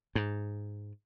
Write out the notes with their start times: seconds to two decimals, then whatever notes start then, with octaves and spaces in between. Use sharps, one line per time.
0.15 G#2